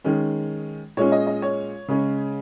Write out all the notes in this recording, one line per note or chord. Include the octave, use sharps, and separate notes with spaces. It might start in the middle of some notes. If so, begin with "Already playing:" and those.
D#3 G#3 C#4
A#2 G#3 C#4 C#5
D#5
D#5
C#5
C#3 G#3 C#4